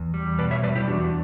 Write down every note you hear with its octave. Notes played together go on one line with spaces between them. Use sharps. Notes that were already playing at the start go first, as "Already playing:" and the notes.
Already playing: E2
G3
B2 B4 D5
C#5 E5
G3 B4 D5
E4 G4
E2 D4 F#4